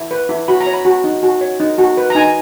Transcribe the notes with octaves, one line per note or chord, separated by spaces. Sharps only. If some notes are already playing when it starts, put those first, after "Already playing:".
Already playing: E4
B4
E4
F#4 B5
A#5
C#5
B5
F#4
D#4
F#4
C#5
D#4
F#4
B4
A#5
D#4 G#5